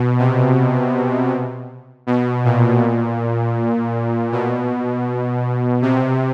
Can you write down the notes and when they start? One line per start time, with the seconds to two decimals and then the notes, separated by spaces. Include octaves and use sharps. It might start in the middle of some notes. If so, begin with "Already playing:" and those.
Already playing: B2
0.19 C3
2.07 B2
2.44 A#2
4.32 B2
5.82 C3